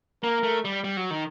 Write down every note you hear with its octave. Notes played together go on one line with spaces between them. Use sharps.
A#3 A#4
A3
G3
G3
F#3
D#3